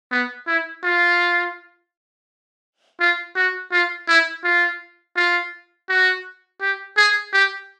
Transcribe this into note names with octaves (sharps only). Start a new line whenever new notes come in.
B3
E4
F4
F4
F#4
F4
E4
F4
F4
F#4
G4
G#4
G4